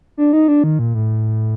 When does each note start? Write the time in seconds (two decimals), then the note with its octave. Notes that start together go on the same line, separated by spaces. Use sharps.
0.17 D4
0.33 D#4
0.48 D4
0.64 D#3
0.79 A#2
0.95 A2